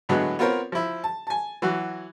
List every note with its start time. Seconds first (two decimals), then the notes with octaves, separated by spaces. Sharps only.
0.09 A2 D3 F#3 G#3 B3
0.39 B3 C4 F4 A#4 C#5
0.72 F3 E4
1.04 A5
1.27 G#5 A5
1.62 E3 F#3 F#4